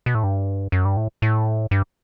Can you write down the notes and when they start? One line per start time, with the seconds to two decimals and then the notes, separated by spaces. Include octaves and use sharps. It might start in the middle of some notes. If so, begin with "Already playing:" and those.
0.06 B2
0.15 A2
0.23 G2
0.72 F#2
0.85 G2
0.97 A2
1.22 A2
1.71 G2